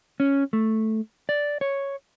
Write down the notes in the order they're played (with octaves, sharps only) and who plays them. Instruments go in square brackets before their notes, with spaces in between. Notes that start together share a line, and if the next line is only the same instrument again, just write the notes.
[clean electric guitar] C#4
A3
D5
C#5